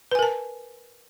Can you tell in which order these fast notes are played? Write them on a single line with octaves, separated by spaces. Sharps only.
B4 G#5 A#4 A5